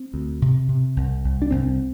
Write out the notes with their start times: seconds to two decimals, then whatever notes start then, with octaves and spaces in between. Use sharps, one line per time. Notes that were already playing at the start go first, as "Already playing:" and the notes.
Already playing: C4
0.14 D2
0.42 C3
0.68 C3
0.96 C2
1.24 C2
1.42 D4
1.51 C2 C4